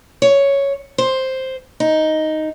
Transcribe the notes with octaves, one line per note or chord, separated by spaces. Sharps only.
C#5
C5
D#4